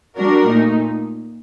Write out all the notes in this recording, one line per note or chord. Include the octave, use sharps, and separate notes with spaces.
G3 D4 F#4 A#4
A#2 A3 D#4